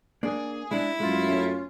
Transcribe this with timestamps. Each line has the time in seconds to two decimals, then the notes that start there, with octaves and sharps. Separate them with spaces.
0.23 A#3 D4 G#4
0.71 G#3 D4 E4
1.00 F#2 G#3 A3 F4
1.29 C#4 C#5